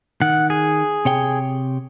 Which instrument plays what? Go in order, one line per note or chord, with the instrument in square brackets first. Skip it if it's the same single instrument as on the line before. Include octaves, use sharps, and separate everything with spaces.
[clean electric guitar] D#3 [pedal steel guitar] F#5
[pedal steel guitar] G#4
[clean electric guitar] C3 C#5 G5